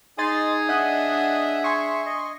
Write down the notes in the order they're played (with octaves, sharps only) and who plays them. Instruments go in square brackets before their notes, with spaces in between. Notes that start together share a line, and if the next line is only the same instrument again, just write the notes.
[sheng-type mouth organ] D#4 [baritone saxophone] G#4 [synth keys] D#5 C6 A6
[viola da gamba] D4 [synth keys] D#5 F#5 [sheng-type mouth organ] E5
[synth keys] G#5 C6 C#6
[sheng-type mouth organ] D#5